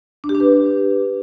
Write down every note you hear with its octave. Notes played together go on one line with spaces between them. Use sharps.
D4
G4
D4
B4